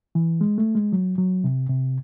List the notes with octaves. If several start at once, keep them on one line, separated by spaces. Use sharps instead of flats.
E3
G#3
A3
G#3
F#3
F#3
C3
C3